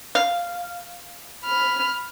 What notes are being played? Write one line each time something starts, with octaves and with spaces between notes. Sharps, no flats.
F5
B5 F6